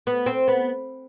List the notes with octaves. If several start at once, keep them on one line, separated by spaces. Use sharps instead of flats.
B3
C4
B3